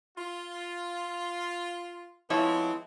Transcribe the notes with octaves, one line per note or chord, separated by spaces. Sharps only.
F4
F3 G#3 B3 C4 E4 C#5